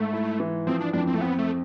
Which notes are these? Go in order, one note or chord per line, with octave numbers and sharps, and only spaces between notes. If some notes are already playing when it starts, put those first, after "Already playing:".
Already playing: G#2 A3
E4
E3
F3 C4
D4
F2 D4
C4
A3
B3 C4
A3